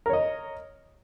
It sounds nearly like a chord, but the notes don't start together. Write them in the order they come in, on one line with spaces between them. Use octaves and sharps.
A#4 C#5 D#5